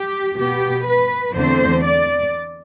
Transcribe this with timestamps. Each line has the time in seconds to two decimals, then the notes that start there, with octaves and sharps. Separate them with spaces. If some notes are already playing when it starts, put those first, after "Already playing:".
Already playing: G4
0.38 B2 B3 G4
0.86 B4
1.34 E2 D3 A3 C4 C5
1.83 D5